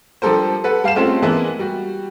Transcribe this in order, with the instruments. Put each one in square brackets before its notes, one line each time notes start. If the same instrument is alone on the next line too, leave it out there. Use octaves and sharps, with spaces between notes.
[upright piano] F3 G3 D4 A4 A#4 C5
A4 B4 F#5
G3 F5 C7 E7
G#3 A3 C4 C#4 F4 A4
E3 G#3 A#3 B3 E4
G3 F#4